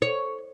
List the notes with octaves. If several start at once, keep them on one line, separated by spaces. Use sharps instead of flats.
C#5